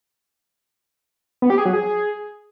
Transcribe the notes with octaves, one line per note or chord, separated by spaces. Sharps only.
B3
G4
G#4
F#3
G#4